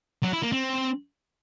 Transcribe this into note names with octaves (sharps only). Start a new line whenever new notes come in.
F#3
E4
A#3
C4